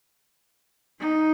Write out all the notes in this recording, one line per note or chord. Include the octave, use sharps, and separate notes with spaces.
D#4